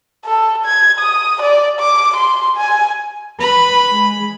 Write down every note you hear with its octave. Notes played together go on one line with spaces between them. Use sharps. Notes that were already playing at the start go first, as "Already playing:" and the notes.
A4
G#6
D#6
D5
D6
C6
G#5
B4 B5
G#3